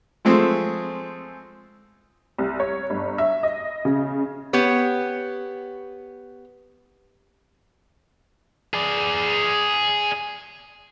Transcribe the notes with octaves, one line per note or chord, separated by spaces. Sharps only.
F3 G#3 A3 C4 G#4
C2
C#5
G1
E5
D#5
C#3
B3 G4 C#5
G#4 D5